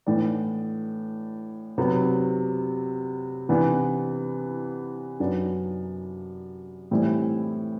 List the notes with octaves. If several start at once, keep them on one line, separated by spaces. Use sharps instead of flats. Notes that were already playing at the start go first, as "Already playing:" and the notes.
A2 E3 B3 D4
C3 F#3 B3
C3 E3 B3 D4
F#2 F#3 B3 D4
A2 E3 G3 C4 E4